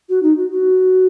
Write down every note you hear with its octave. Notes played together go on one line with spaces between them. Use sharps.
F#4
D#4
F#4
F#4